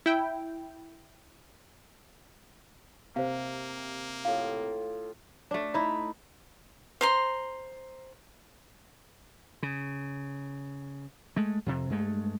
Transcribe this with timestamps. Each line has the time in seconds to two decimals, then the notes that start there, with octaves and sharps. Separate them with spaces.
0.06 E4 G5
3.16 C3 A#3 C5 F5
4.25 A2 F4 F5
5.51 A3 D4
5.74 D#4 E4
7.01 C5 A#5 C6
9.63 C#3
11.36 G#3 A3
11.66 F2 C3
11.90 G2 G#3 A3